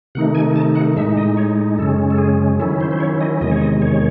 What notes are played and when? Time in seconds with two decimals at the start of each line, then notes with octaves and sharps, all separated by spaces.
0.15 C3 D#3 A3 D#4 F#5
0.35 G#5
0.56 A5
0.75 F#5
0.96 A2 G#3 D#4 E5
1.17 D#5
1.37 C#5
1.78 F#2 C#3 G#3 C#4 A4
2.10 A4
2.18 G#4
2.59 D#3 F#3 C#4 E4 A4
2.80 C5
2.91 C5
3.00 C#5
3.21 D#5
3.41 E2 C3 D#3 G#3 D#5
3.51 C#5
3.61 D#5
3.82 C#5